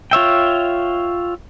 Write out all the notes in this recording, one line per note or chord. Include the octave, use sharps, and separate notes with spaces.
F4 C#5 E5 G5